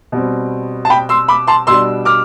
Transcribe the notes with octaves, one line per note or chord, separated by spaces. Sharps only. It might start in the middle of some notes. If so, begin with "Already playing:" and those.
B2 G3 C4
A5
G5 B5
C6 E6
B5 D6
A5 C6
B2 G3 D4 C6 E6
D6 F6